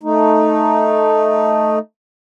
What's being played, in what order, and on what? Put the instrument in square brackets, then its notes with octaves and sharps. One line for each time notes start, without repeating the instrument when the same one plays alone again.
[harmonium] A3 D#4